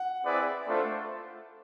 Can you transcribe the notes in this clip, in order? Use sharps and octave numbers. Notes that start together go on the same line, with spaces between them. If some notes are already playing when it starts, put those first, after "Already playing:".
Already playing: F#5
C4 E4 G#4 B4 D5
A3 D4 F4 A4 C5